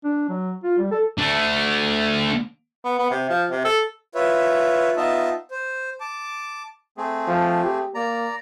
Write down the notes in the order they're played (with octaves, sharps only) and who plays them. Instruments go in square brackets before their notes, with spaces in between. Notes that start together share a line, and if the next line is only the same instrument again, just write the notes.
[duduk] D4
F#3
F4
G3
A4
[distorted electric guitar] A3 D4
[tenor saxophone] B3
B3
C3
F3
C3
A4
[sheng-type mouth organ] F4 B4 C#5 E5
B3 D#4 F4 D#5 E5 A5
C5
A5 D6
[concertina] A3 C4 G#4
[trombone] F3
G4
[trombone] A#3 [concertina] D5 A#5